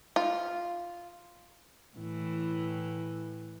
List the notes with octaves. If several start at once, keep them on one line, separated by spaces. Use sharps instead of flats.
F4
A2 E3